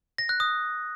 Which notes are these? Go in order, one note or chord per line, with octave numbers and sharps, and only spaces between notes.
A#6
F#6
D#6